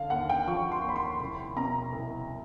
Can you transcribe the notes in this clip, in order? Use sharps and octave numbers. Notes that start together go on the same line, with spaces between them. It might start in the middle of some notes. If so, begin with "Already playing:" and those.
Already playing: D3 F5
D#2 F#5
G5
F3 C#6
C6
D#2 B5
C6
C2 B5
B2 A#5
C2